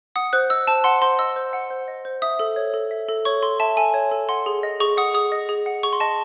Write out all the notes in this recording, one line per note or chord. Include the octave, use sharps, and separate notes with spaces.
F#5 D#6
C5 F#6
D#5 E6
C5 A5
F#5 C6
C5 C6
D#5 E6
C5
F#5
C5
D#5
C5
E5 D#6
A4
C#5
A4
E5
A4
C#5 C#6
A4 C6
E5 A5
A4 G#5
C#5
A4
F#5 C6
G#4
D#5
G#4 C#6
F#5 D#6
G#4 D#6
D#5
G#4
F#5
G#4 C#6
C6
D#5 A5